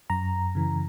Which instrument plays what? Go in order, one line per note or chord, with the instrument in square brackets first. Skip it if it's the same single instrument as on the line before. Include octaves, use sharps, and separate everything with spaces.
[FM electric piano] F#2 A#5
C#3 E3